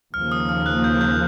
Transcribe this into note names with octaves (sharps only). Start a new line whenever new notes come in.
D#2 C#3 F3 A#3 F6
D#6
F6
F#6
G6
G6